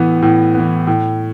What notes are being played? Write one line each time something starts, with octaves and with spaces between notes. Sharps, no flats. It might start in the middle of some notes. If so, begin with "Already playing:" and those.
Already playing: A2 E3 B3
A2
E3 B3
A2